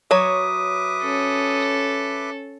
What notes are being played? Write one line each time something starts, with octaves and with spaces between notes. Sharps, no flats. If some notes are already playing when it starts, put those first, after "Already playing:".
F#3 B4 C#5 E5 D6 D#6
C#4 A4